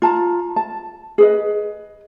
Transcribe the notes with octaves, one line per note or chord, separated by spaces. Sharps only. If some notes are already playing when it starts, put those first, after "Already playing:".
F4 A5 A#5
A5
G#4 B4 D#5